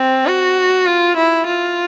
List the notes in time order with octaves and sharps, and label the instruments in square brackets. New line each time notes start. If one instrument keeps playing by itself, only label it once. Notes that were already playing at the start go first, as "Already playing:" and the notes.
Already playing: [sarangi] C4
F#4
F4
E4
F4